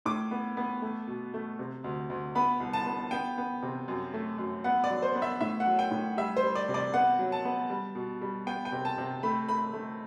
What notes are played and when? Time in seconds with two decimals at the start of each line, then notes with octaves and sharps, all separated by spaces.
0.06 A2 D6
0.31 B3
0.57 B3
0.82 A3
1.07 B2
1.34 A3
1.59 C3
1.84 D2
2.10 D2
2.35 B3 B5
2.60 C2
2.73 A5
2.86 B3
3.11 B3 G5
3.38 B3
3.63 C3
3.88 F#2
4.14 A3
4.38 F#2
4.64 B3 F#5
4.84 D5
4.91 F#3
5.02 C5
5.15 B3
5.22 E5
5.41 A2 E5
5.60 F#5
5.67 F#3
5.79 G5
5.91 A2
6.17 G3 E5
6.37 C5
6.43 G3
6.55 D5
6.68 C3
6.74 D5
6.94 B3 F#5
7.19 F#3
7.32 A5
7.45 B3
7.70 G3
7.95 B2
8.22 G3
8.46 B3 G5
8.65 G5
8.72 C3
8.85 A5
8.98 C3
9.23 A3 B5
9.49 A3 B5
9.73 A3